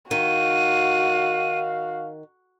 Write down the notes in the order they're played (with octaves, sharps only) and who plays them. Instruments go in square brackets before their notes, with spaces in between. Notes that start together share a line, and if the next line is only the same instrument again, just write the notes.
[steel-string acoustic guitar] D#3 [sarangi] F#4 [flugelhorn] F5 [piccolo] D#7